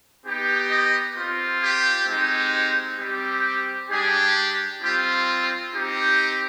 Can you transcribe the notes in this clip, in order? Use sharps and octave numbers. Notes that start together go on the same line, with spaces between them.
B3 D#4 G4
D#5
C4 F4
G4
G#3 C4 D#4 G4
G3 C4 G4
G3 D4 G4 G#4
G3 C4 F4 G4
C4 D#4 G4